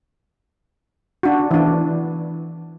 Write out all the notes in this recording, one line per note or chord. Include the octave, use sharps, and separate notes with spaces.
D4 F#4
E3 D4